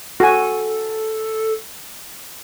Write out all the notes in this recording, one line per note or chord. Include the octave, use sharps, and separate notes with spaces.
F#4 A4 G#5